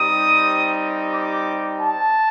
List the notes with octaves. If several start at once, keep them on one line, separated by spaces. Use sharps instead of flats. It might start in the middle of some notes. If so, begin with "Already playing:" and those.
Already playing: G3 C4 D#4 G4 D#6
D6
A5